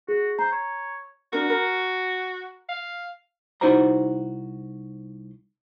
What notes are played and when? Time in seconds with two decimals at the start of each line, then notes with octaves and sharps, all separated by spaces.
0.08 F#4 G#4
0.39 C5 A#5
0.52 C#5
1.33 D4 F#4 A#4
1.50 A#4
2.69 F5
3.61 C2 D#4 E4 F#4 C5 A#5